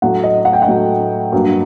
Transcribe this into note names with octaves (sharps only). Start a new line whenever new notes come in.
A2 F#3 A3 F#5
D#5
F#5
G5
F#5
A2 F#3 A3
G2 F#3 A#3